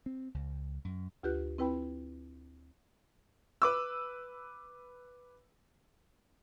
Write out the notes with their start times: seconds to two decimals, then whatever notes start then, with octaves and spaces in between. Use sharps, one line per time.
0.06 C4
0.34 C#2
0.85 F#2
1.23 D2 F4 G4 B4 F#6
1.58 C4 E4 B4 G5 B5
3.62 B4 D6 E6